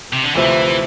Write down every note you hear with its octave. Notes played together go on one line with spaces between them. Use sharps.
C3
D3
D2 C3 E3 F3 C4 E4